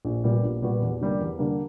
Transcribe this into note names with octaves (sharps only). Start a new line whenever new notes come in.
A#1
A#2 G3 B3 F#4
A#1
A#2 G3 B3 F#4
E2
D3 G3 A#3
E2
D3 G3 A#3